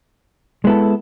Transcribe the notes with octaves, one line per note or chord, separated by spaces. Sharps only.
G#3 B3 E4 A4